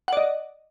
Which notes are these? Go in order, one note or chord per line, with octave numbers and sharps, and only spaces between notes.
D5 D#5 F#5